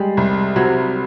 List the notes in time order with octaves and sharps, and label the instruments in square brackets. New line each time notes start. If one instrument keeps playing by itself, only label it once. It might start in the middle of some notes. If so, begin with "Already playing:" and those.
Already playing: [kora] G3 [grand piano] G#3
[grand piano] C2
[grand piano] C3 [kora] F#3